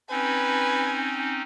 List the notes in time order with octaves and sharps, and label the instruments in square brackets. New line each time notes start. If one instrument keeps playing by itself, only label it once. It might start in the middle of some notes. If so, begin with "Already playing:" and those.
[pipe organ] C4 C#4 D#4 [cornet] B4 [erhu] G#5